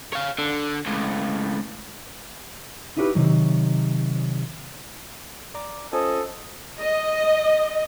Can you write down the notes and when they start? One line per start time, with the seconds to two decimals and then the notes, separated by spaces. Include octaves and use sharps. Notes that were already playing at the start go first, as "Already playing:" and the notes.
0.13 C#5 F5
0.38 D3
0.86 C#2 A2
2.97 D#4 E4 F#4 G4 A#4 B4
3.15 C3 D#3 F#3
5.54 D5 A#5 D6
5.93 C#4 F4 A4 C5 D#5 G#5
6.79 D#5